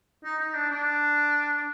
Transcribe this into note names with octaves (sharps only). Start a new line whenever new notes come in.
D#4
D#4
D4
D4